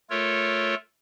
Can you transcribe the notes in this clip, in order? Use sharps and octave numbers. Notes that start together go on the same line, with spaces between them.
A3 F4 A4 A#4 C#5